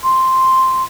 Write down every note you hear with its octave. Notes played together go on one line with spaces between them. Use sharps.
C6